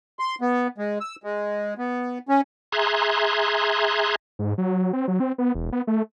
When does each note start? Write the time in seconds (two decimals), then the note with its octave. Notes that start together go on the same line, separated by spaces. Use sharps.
0.19 C6
0.41 B3
0.78 G#3
1.01 E6
1.24 G#3
1.78 B3
2.29 C#4
2.72 G#4 E5 A#5 C6 F#6 G#6
4.39 G#2
4.58 F#3
4.93 C4
5.08 F#3
5.20 C4
5.38 B3
5.55 E1
5.72 B3
5.87 A3